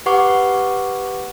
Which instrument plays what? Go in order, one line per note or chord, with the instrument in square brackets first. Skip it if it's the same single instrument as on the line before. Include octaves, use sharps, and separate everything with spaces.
[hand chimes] G4 B4 F#5 C#6 D6